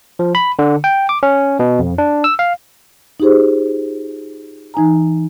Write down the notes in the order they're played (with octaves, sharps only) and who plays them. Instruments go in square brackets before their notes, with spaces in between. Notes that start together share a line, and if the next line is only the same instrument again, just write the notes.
[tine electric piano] F3
B5
D3
G5
D6
C#4
B2
F2
D4
E6
F5
[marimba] D#4 F4 G4 G#4 C5
E3 D#4 G#5 A#5